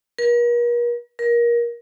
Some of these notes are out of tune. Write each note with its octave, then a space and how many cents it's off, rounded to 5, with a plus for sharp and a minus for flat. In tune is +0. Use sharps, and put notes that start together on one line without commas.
A#4 +45
A#4 +25